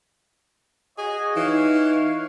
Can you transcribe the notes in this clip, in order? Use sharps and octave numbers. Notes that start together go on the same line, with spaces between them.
F#4 G#4 C#5 D#5
E3 D#4 C#5 F5